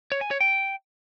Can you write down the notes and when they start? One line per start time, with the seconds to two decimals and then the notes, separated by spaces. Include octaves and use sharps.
0.12 C#5
0.21 G#5
0.31 C#5
0.41 G5